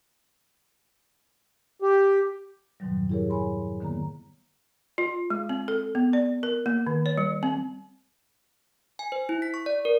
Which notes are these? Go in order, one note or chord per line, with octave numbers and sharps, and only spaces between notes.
G4
F2 G#2 B2 D#3 F#3 G3
E4 G4 G#4 A#4 C#5
C#5 G#5 B5 C6
D3 D#3 A#3 B3 A#5
F4
G#3
C4
A4
B3
D5
A#4
A#3
D#3
C#5
G3
C4
G#5
C5
E4
B6
C#6
D5
A#4